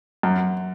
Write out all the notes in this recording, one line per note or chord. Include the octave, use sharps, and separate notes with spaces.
F#2